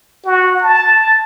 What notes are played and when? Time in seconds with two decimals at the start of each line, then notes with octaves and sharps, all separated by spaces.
0.25 F#4
0.61 A5